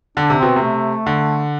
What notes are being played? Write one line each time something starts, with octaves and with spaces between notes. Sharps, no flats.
D3 D4
C3
B2 C4
C3
A3
D3